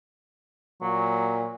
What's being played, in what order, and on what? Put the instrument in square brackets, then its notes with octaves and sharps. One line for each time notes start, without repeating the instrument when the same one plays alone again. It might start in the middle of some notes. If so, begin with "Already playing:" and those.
[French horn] A#2 [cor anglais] F#3